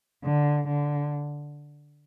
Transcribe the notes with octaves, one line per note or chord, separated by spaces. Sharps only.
D3
D3